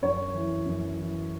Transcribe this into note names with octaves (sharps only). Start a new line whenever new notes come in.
F#2 C#5
E3
F#2
E3